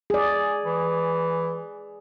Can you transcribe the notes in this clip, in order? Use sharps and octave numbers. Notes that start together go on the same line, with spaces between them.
G#4 D5
E3